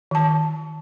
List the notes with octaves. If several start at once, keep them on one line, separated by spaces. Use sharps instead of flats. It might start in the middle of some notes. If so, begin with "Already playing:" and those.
D#3 A5